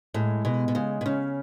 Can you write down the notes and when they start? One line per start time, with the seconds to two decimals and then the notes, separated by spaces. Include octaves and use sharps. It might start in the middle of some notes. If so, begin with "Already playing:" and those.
0.14 A2 G#3
0.45 B2 G#3
0.68 B2
0.75 C#3 G#3
1.01 B2
1.05 C#3 C#4